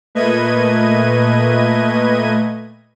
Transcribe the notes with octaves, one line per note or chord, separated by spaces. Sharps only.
A#2 A3 B4 D#5 G#6 D#7